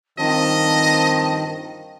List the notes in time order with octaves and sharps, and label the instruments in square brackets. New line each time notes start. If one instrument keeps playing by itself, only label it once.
[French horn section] G2 F3 C4 [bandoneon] D#3 [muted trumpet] D#5 [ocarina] A5